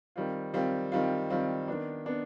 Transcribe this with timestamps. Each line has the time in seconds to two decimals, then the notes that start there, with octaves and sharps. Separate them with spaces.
0.16 D#3 G3 C4 F4
0.54 D#3 G3 C4 F4
0.92 D#3 G3 C4 F4
1.30 D#3 G3 C4 F4
1.68 D#3 B3 D4
2.06 B3 D4